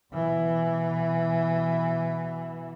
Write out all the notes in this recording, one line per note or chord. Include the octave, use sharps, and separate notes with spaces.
B2 E3